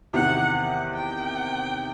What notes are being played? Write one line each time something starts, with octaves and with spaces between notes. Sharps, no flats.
E2 C3 D#3 F#5
F#5
G5